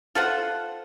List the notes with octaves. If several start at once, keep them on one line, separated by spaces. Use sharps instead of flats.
F4 A4 C5 F#5